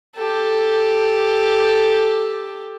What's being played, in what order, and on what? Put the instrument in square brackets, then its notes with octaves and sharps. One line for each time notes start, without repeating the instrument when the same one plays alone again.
[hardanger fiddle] G4 A4